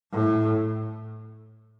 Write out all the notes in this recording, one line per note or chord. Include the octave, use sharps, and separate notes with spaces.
A2